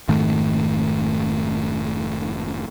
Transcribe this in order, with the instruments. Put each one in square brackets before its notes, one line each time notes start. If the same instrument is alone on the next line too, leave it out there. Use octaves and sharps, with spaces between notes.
[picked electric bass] F1 G#2 D#3 A3